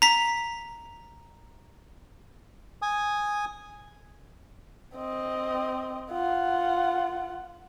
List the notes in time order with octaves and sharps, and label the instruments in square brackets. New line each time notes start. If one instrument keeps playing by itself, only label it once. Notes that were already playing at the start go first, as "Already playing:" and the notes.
[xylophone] A#5 B6
[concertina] G#5 D#6
[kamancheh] C4 D#5
F4 F#5